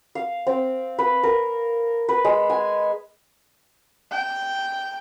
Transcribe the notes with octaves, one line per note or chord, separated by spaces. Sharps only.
F5
C4
B4
A#4
B4
G#3
G#5
G5